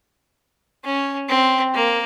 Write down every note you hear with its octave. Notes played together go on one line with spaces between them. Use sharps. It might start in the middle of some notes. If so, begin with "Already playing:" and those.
C#4
C4
A#3